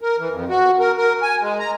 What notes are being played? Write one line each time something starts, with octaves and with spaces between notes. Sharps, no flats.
A#4
E3
F2
F#4
A#4
A#4
G#5
G#3
A#5